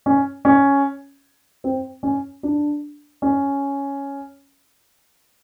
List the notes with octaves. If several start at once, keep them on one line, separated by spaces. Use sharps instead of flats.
C#4
C#4
C4
C#4
D4
C#4